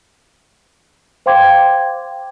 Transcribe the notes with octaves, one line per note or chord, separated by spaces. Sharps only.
C5 F5 G5 C6 D6 G#6